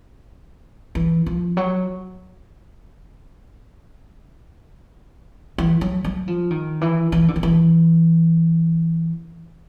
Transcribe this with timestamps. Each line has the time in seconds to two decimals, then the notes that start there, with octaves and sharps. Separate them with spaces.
0.95 E3
1.26 F3
1.57 F#3
5.58 E3
5.81 F#3
6.04 F#3
6.28 F3
6.51 D#3
6.81 E3
7.12 E3
7.28 D3
7.36 D#3
7.43 E3